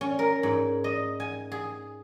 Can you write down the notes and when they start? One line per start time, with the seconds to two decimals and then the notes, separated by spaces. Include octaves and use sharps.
0.01 C#4
0.19 A#4
0.43 G#2
0.84 D#5
1.20 G#5
1.52 G#4